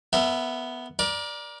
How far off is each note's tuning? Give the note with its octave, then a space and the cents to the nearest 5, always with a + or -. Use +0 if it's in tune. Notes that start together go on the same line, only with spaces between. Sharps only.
B3 +0 A#4 -35 E5 +0
A#4 +30 D5 +0